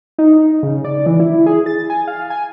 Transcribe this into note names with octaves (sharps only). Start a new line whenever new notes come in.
D#4
D#4
C#3
D5
E3
E4
G#4
A6
G#5
F5
G#5